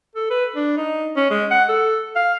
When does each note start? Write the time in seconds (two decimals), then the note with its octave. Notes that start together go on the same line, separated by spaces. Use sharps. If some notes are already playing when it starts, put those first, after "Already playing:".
0.16 A4
0.30 B4
0.56 D4
0.77 D#4
1.16 C#4
1.31 G#3
1.51 F#5
1.69 A4
2.16 F5